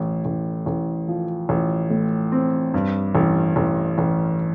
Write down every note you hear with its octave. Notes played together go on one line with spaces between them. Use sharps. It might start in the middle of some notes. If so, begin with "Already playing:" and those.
Already playing: A1 A2
A1
A1
F3
A1
A2
C4
G2
A1
A1
A1